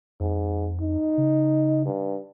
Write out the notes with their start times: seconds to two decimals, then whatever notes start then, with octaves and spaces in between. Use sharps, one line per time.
0.20 F2 G#2
0.81 D#4
1.18 C#3
1.86 G2